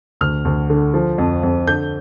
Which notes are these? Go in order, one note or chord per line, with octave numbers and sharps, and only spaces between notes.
D2 F6
D2
D3
F3
F2
F2
D3 G6